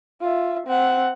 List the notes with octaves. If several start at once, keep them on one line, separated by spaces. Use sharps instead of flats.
F4 E5
C4 F#5